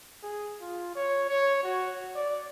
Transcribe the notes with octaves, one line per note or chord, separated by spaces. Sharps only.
G#4
F4
C#5
C#5
F#4
D5